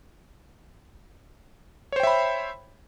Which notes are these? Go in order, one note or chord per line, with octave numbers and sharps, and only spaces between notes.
C5 C#5 E5 G5 B5